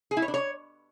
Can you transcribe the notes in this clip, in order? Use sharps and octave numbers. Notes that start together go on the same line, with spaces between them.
G#4
E4
C#5
D4
C#5